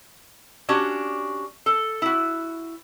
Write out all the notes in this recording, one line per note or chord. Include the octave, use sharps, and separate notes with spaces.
C#4 D4 F#4 G4
A4
E4 F#4